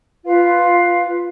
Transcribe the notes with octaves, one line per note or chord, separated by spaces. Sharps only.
F4 B4 F5